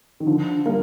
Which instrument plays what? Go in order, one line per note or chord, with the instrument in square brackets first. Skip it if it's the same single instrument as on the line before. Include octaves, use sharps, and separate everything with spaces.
[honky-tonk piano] D#3
D3 F3
G3 A#3